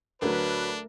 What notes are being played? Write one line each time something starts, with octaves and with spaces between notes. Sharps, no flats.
D2 F#3 A3 D4 A#4 B4